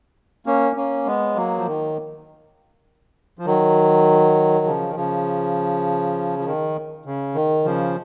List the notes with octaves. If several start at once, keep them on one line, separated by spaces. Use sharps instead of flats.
A#3 C#4
A#3 C#4
G#3 B3
F#3 A#3
F3
D#3
F3
D#3 F#3
C#3 F3
D#3
C#3 F3
F3
D#3
C#3
D#3
C#3 F3